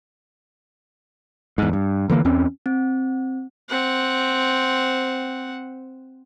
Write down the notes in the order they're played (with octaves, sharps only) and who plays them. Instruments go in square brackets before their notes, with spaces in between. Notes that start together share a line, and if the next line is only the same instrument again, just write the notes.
[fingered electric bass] E2 G#2
G2
D3 E3 A#3
E2 C4 C#4
[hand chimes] C4
[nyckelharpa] C4 F#5